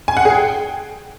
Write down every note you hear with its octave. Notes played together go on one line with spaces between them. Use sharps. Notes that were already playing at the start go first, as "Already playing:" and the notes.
G#5
F#5
G#4
G5